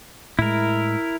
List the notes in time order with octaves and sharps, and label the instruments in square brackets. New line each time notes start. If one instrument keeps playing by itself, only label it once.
[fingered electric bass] A2 G#3 [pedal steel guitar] E4 A#4